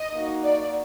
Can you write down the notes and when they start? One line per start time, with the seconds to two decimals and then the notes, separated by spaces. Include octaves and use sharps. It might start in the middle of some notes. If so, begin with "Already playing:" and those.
Already playing: D#5
0.13 A#3 D#4 F#4
0.44 D5